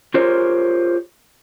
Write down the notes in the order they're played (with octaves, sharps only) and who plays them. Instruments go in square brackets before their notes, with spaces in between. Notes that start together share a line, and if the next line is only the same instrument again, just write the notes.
[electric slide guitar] F4 G4 G#4 A#4 C5 C#5